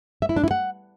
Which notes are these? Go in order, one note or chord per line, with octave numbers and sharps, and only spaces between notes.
E5
E4
D4
E4
F#5